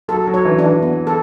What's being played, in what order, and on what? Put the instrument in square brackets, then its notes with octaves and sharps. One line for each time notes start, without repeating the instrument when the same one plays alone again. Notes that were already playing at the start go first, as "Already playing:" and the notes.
[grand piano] F#3 [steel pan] A4
[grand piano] F#3
[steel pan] C#5
[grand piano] E3
[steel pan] D4
[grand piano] E3
[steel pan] B3
A4